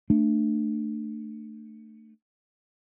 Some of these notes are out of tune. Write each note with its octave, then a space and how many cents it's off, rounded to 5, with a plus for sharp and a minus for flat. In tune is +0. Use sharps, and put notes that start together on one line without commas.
A3 +20 D4 +25